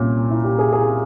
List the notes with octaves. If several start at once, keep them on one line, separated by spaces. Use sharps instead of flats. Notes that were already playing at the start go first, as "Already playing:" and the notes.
Already playing: C2 A#2 C#4
E4
G4
G#4
G#4